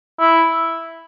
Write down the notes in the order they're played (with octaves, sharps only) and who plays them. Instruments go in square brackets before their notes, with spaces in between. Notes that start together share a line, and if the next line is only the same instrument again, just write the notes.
[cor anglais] E4